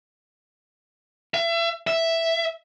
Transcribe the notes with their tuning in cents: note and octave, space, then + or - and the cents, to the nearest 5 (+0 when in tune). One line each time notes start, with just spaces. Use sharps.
E5 +35
E5 +0